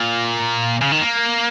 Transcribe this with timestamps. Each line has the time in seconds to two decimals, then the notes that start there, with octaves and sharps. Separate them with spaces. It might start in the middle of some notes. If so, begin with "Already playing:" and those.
Already playing: A#2
0.82 C#3
0.92 D#3
1.01 A#3